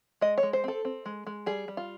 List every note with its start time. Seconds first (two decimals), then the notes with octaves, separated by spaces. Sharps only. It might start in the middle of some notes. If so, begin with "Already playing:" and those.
0.21 G#3 D#5
0.38 C#5
0.43 G#3
0.53 C5
0.64 C4 A4
0.85 C4
1.06 G#3
1.27 G#3
1.46 G3 G#4
1.68 G3
1.77 F4